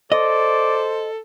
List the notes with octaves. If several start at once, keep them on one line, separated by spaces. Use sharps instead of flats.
A4 C5 D5 D#5